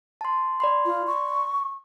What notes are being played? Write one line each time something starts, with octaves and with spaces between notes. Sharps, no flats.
A5 C6
D5 B5 C6
F4
C#6